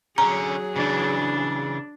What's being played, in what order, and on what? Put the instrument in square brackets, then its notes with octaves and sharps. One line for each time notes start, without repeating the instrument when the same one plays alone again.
[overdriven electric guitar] D3 C#4 [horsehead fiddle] F#3 G#4 [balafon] A#5
[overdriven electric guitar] C#3 E3 [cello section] D4